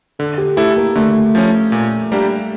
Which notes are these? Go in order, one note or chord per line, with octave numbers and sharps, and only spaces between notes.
D3 A4
G4
A3 E4 G4 A4
A#3
D3 A3
F3 C#4
A#2
G3 A#3 D4 G4